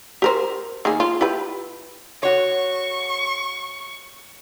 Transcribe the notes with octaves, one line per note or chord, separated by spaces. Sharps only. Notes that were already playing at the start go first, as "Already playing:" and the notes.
G4 A#4 C5
D#3 A#3 G#4
F4
E4 G4 B4
F#4 C#5 C#6